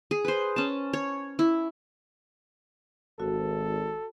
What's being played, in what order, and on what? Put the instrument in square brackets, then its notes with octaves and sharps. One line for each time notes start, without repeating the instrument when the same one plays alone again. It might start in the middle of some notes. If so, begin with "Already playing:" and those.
[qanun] G#4
B4 C5
C#4 A5
C#5
E4
[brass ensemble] G#1 [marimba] F#4 [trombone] A4